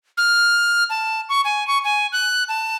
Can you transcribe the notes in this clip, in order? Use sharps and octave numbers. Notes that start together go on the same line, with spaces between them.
F6
A5
C#6
G#5
C#6
G#5
F#6
A5